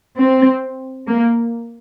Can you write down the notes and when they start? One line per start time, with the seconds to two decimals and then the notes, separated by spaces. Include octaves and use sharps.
0.16 C4
1.09 A#3